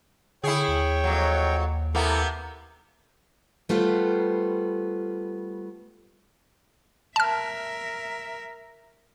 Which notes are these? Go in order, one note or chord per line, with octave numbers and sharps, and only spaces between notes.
D3 E4 G#4 C#5 G5
D#2
F2 F#3
C3 A#3 B3 E4 A4
G3 A3 B3 F4 C5
A#4 E5 A5 F6